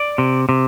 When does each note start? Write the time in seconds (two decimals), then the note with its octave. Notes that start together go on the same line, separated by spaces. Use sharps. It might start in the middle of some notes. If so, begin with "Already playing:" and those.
Already playing: D5
0.18 C3
0.49 C3